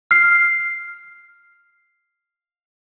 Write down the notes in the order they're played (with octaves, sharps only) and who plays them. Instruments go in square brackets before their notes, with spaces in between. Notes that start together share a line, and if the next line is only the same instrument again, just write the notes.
[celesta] F6 C7